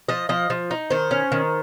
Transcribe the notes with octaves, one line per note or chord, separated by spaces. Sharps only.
F3 D#5
F3 D#5
F3
D#4
D#3 C5
C#4
D#3